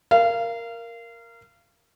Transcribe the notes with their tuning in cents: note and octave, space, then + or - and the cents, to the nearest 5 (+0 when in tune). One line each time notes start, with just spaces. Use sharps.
A#4 +0 F5 -25